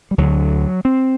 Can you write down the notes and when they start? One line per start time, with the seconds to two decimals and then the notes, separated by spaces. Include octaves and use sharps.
0.11 G3
0.18 D2 D3 F#3
0.85 C4